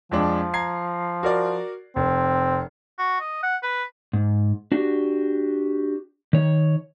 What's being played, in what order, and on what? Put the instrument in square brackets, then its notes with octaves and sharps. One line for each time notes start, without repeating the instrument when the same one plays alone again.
[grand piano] F2 G#3 D4 [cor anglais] F3
[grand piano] A#5 G#6 C7
F#4 A#4 D5
[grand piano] F1 [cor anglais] C4
[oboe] F#4
D#5
F#5
B4
[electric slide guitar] G#2
D4 F#4 G4
D#3 C#5